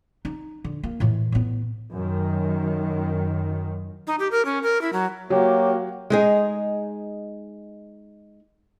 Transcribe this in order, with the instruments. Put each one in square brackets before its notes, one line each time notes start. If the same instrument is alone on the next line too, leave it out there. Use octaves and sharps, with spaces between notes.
[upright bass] D#4
D3
A#3
A2 E3
A2 B3
[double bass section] F#2 D#3
[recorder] D#4
G4
A#4
C#4
A#4
E4
F#3
[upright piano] F#3 [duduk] A#3 [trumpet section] F#4 G4 [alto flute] C#5
[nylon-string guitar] G#3 D#4 G#4